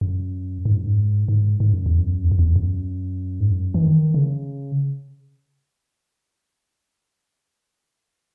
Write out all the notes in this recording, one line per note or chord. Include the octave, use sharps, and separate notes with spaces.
F#2
G#2
F#2
G#2
G#2
G#2
F#2
E2
F#2
E2
F#2
E2
F#2
G#2
F#2
E3
D#3
C#3